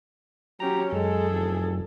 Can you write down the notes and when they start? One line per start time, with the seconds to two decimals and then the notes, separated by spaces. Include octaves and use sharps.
0.60 F#3 C#4 G4 A#5
0.92 F#2 G#3 G#4 A4
1.31 F1